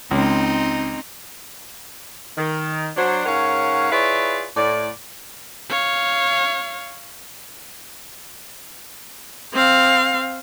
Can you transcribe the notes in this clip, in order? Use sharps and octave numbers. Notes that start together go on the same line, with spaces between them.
C#2 C4 D#4
D#3
F#3 D4 C5
G#2 C#4 A#4 C#5 F5 F#5
E4 F4 G#4 B4 C#5 D5
A2 D5
C#5 F5
C4 F5